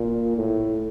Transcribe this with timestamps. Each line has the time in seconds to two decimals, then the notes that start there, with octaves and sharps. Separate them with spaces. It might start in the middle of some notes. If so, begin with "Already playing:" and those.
Already playing: A#2
0.37 A2